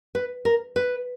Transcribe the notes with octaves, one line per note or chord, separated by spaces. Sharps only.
B4
A#4
B4